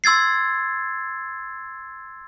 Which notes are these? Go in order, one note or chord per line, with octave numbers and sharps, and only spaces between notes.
C6 E6 G#6 A6 C7